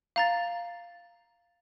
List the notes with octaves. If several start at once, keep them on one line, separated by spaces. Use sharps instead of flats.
F5 A#5 A6